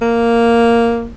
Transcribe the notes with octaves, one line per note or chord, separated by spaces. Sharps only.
A#3